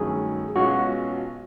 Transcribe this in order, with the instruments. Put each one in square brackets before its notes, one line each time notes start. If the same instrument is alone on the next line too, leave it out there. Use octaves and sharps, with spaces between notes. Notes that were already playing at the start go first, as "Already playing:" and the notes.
Already playing: [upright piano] G2 D#3 F#3 A3 C#4 [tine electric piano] G#4
[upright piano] B1 B2 G#3 C#4 F4 [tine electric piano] F#4